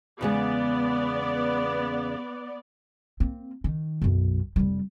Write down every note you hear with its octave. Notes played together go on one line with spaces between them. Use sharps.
E2 C#3 G#3 B3 D5
A#3 C4
D#3
B1 F#2
F1 G3